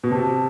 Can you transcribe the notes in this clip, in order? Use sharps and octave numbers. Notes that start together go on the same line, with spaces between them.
B2
C3 A5